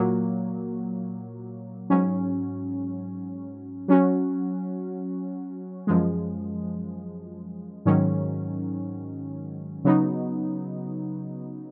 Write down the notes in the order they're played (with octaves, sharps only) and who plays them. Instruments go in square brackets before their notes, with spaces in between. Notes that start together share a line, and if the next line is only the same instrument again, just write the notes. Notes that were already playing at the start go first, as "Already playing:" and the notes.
Already playing: [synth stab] A#2 F#3 A#3
G#2 F#3 C#4
F#3 C#4 F#4
F#2 F3 G#3
G#2 D#3 F#3 C#4
C#3 F#3 B3 D#4